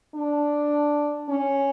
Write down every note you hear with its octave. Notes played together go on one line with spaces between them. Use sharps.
D4
C#4